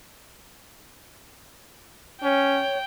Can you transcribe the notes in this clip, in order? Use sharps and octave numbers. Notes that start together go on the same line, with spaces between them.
C#4 C#5 G5